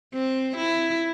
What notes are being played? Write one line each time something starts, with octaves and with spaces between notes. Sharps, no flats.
C4
E4